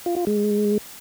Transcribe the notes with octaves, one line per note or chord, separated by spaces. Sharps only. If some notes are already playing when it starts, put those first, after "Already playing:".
F4
F4
G#3